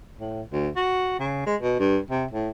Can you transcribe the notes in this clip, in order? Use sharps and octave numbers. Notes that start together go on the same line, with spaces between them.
A2
D2
F#4
C#3
G#3
B2
G2
C3
A2